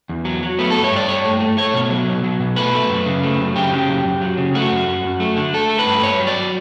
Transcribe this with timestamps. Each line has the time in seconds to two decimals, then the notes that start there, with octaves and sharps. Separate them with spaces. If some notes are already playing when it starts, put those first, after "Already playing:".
0.09 E2
0.25 F#3
0.43 F#3
0.59 A3 B3
0.70 G2 A4
0.84 C#5
0.92 G2 D5
1.08 G2 C#5
1.25 A3
1.40 A3
1.57 A3 C#5
1.74 B2
1.90 F#3
2.07 B2
2.24 F#3
2.40 B2
2.56 A3 B4
2.73 A3
2.89 F#2
3.06 C#3
3.23 A3
3.39 F#2
3.55 C#3 G4
3.72 C#3
3.88 F#2
4.05 F#2
4.21 F#3
4.37 C#3
4.55 A3 F#4
4.71 F#2
4.87 F#2
5.05 F#2
5.20 A3
5.37 D3
5.54 A3 A4
5.70 A3
5.79 B4
5.86 G2
6.02 G2 C#5
6.20 F#3
6.27 D5